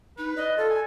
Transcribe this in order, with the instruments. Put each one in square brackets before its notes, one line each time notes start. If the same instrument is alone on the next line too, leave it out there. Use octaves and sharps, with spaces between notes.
[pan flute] D#4 [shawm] B4
[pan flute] D5 [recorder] D#5
[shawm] F4 [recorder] A4
[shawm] G#5